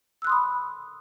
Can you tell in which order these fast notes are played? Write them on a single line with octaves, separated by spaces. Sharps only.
E6 F#6 C6 D#6 B5